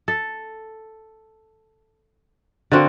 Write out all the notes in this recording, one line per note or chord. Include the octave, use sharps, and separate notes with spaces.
A4
D3 A#3 C4 F#4